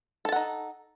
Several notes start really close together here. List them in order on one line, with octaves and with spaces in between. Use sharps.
A4 A5 F#5 D#4